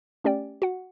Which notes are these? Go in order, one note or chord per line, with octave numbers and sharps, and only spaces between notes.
A3 C#4 G4 D5 G5
F#4 F#5